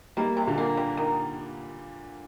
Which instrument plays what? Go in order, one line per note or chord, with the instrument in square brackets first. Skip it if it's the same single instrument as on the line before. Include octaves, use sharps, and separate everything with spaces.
[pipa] D#3 [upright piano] G3 A#3
[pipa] C3
[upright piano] A#2 D3
[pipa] A#3
G3
D#3